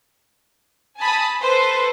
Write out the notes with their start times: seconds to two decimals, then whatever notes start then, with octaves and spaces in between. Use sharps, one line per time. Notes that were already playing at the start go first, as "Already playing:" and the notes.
0.99 G#5 A5 B5 D#6
1.40 A4 B4 C5